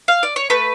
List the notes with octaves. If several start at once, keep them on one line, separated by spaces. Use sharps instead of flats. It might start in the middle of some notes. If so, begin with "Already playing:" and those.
F5
D5
C#5
A3 B4